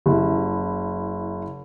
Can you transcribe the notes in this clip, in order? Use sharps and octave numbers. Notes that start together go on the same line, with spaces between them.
F#1 E4